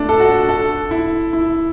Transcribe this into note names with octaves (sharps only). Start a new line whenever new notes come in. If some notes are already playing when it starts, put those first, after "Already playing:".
Already playing: A3 D4
A4
F#4
A4
E4
E4